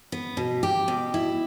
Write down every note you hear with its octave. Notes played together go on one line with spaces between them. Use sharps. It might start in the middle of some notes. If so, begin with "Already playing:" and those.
B3
B2
G4
B2
E4